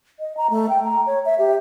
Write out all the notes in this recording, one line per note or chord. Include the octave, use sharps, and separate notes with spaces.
D#5
A#5
A3
G5
A#5
C#5
E5
G4